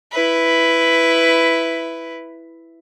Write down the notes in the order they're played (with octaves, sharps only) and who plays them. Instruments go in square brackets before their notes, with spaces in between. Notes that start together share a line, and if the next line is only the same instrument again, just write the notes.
[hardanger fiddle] E4 B4